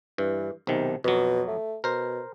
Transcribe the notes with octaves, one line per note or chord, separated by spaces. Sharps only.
G2 E3
B1 C3 D#3
F2 B2 F#3
A3
B2 A#4 C5